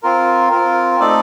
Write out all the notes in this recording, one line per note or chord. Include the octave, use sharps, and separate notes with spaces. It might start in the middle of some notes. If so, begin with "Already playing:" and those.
C4 F4 A#4
C4 F4 A#4
A3 C4 D#4 A4 D5